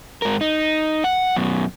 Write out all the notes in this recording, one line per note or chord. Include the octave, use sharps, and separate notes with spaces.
G#2 A#4
D#4
F#5
F#2 B2